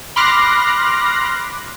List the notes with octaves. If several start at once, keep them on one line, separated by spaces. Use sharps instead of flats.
B5 C6 D6 F6 F#6 A#6